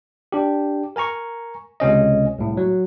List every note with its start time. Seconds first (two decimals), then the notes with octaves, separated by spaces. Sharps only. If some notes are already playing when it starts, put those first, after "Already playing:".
0.32 D4 G4
0.96 A#4 G#5 A#5 C#6
1.80 C#2 C3 C#4 D#5
2.39 C2 A2
2.57 F#3